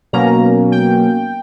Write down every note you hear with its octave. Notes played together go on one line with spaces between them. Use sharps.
B2 F#3 A#3 C#4 A#5
G5